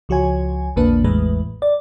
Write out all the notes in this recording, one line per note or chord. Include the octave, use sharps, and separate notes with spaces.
C#2 F3 F#4 C#5 G#5
A#1 E2 D3 A#3 D4 B4
A1 E2 A2 E3 G#3 B4
D5